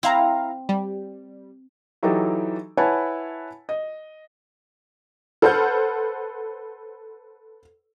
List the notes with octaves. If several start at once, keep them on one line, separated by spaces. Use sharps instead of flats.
C4 E4 F5 A#5
G3
E3 F#3 D#4 G4 A4
E4 B4 C#5 F#5 G#5 A5
D#5
A4 B4 C5 F#5 F6 G6